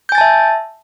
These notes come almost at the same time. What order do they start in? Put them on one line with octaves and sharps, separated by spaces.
G6 G#5 A6 A5 E5